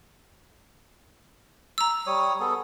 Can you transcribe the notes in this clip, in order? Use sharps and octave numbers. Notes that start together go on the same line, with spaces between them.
A#5 E6
G3 C#5 D#6
B3 G#4 A4